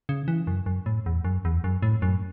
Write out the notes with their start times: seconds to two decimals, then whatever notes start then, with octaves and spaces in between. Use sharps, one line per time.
0.09 C#3
0.28 E3
0.47 F#2
0.66 F#2
0.86 A2
1.06 E2
1.25 F#2
1.45 E2
1.64 F#2
1.82 A2
2.02 F#2